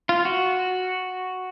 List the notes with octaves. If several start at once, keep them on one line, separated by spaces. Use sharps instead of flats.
F4
F#4